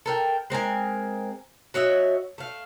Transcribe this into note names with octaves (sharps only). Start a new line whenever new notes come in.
A4 A#4 G5
G#3 C4 A#4 G#5
F#4 C#5 D#5 E5
A3 F5